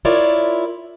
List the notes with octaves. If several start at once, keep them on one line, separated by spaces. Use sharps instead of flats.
E4 F4 A#4 C#5 D5